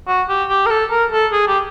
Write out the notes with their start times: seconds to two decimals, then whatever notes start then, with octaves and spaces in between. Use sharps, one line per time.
0.07 F#4
0.29 G4
0.49 G4
0.66 A#4
0.70 A4
0.90 A#4
1.12 A4
1.32 G#4
1.47 G4